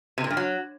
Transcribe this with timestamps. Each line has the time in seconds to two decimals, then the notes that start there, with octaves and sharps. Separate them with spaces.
0.18 C3
0.24 A#2
0.30 G2
0.37 F#3